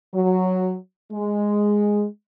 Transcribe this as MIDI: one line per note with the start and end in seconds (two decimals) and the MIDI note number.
0.14 0.75 54
1.11 2.05 56